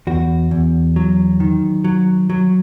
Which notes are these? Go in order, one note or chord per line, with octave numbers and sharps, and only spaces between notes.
E2 F#4
E2
F#3
D#3
F#3
F#3